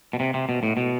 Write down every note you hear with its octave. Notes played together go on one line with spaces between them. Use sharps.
B2
C3
C3
B2
A2
B2